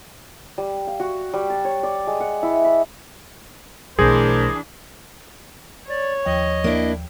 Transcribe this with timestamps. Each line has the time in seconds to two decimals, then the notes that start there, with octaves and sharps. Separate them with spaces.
0.58 G3
0.87 F5
1.00 F#4
1.34 G3
1.50 A5
1.65 C#5
1.83 D5
2.07 G#3
2.20 F#5
2.43 E4
2.64 B5
3.99 B1 E3 A3 D4 G#4 A#4 C5
5.89 C#5 D5
6.25 D#2 F3 D#5 G5
6.64 A#3 D4 E4